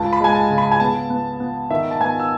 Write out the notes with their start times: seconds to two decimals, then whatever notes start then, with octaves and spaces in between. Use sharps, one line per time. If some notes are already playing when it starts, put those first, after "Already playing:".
Already playing: C#2 A5
0.13 B5
0.21 G#3 G#5
0.35 A5
0.50 C#3
0.58 B5
0.71 G#5
0.80 B3 A5
1.10 B3
1.40 B3
1.70 D#3 E5
1.91 A5
2.01 B3 G#5
2.20 E6